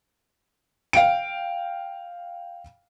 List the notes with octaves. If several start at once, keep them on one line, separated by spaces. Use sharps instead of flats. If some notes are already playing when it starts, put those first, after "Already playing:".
F5 G5 D7